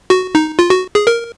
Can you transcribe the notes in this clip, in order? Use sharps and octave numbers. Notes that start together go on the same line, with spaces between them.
F#4
D#4
F4
F#4
G#4
A#4